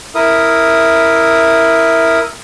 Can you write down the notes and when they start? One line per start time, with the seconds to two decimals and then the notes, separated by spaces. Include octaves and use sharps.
0.15 E4 A#4 E5 D#6